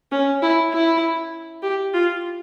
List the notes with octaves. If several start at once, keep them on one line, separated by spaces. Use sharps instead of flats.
C#4
E4
E4
G4
F4